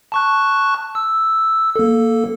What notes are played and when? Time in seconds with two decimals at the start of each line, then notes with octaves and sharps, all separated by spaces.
0.12 A5 C#6 F#6
0.95 E6
1.76 A#3 A4